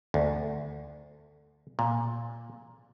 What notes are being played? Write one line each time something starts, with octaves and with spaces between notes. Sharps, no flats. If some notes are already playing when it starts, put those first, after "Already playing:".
D2
A#2